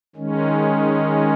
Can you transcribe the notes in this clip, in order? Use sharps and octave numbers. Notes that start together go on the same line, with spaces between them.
D#3 G#3 C#4